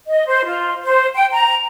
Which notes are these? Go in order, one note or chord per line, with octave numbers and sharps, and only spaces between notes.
D#5
C5
F4
C5
G5
A#5